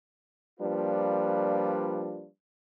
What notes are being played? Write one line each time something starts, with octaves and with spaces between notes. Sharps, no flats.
F3 G3 A#3 D4 F4 B4